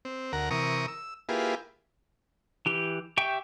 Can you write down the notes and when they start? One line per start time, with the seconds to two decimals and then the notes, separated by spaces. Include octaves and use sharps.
0.05 C4
0.33 D2 A#4 F#5 A#5
0.51 C3 E3 A#4 A#5 C#6 D#6
0.88 E6
1.29 A#3 E4 F4 G4 G#4 B4
2.66 E3 G4
3.18 G4 E5 G5 C#6